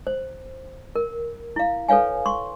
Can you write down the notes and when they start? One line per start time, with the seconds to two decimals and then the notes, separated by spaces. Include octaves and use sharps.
0.07 C5
0.96 A#4
1.56 E4 F5
1.89 A4 B4 C#5 F5 G#5
2.26 C6 C#6